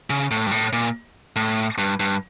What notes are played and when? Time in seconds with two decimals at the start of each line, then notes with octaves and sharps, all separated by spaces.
0.10 C#3
0.31 A2
0.47 G2
0.51 A2
0.73 A#2
1.36 A2
1.78 G2
2.00 G2